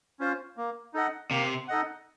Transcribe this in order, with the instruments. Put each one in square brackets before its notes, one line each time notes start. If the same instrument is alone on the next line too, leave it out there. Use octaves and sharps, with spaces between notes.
[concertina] C#4 F4 C5
A#3
D#4 A4 D#5 F#5
[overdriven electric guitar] C3 [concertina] A#3
[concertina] D#4 A4 D#5 F#5